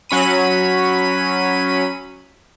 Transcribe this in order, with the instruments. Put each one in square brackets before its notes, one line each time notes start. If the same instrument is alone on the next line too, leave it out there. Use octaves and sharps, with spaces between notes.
[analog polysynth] F#3 C#4 B5 D#7